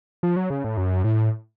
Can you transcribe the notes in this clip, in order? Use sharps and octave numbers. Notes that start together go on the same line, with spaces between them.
F3
F#3
C#3
A2
F#2
A2